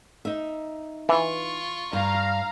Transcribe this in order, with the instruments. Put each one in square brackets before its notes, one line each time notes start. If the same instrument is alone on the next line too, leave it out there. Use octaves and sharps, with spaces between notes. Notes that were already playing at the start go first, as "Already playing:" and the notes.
[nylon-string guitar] D#4 E5
[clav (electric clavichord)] E3 [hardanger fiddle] F4 C#6
[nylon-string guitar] G2 [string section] F5 A#5